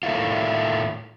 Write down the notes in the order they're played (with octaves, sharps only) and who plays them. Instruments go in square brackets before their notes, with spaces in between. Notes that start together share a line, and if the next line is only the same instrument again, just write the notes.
[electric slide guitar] A2 D#3 A3 E4 F4